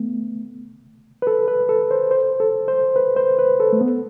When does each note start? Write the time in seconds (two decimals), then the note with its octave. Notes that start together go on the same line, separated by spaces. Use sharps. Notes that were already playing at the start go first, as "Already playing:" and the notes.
Already playing: A3 B3
1.22 B4
1.27 A4
1.48 B4
1.69 A4
1.91 C5
2.11 C5
2.40 A4
2.68 C5
2.96 B4
3.16 C5
3.39 B4
3.60 A4
3.73 A3
3.81 B3